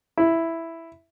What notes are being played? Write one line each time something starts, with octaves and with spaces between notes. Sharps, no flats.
E4